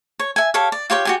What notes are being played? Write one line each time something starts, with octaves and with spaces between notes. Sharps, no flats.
C#5
E5 G#5
G4 A4 C#5 F5
D5
F4 G4 C#5 G5
F#4 G4 G#5